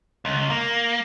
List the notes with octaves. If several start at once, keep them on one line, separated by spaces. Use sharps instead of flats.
C#2
A#3